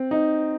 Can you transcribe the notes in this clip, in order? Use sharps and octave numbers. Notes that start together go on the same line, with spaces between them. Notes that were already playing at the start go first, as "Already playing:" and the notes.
Already playing: C4
D#4